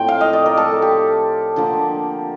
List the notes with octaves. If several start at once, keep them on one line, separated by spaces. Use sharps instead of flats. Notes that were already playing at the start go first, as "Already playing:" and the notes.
Already playing: A2 F3 C4 G5
F5
D#5
D5
A#4
A4
G4
D3 F3 A#3